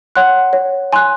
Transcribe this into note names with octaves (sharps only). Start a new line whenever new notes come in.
C#5 F#5 C6 F#6
C#5
G#5 C6 F#6